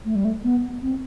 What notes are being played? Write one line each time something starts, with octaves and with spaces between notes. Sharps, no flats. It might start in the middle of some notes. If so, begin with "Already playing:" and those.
A3
G3
A3
B3
C4